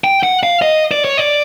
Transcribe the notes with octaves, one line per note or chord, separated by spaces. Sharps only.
G5
F#5
F5
D#5
D5
C#5
D5